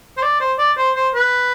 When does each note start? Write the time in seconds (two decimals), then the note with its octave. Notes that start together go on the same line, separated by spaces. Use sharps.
0.17 C5
0.22 D5
0.40 C5
0.58 D5
0.78 C5
0.96 C5
1.15 B4